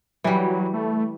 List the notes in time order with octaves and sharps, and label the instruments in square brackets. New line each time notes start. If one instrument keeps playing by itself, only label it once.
[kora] E3 G3 [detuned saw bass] F#3
[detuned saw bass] A3